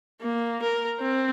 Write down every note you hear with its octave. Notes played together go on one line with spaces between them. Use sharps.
A#3
A#4
C4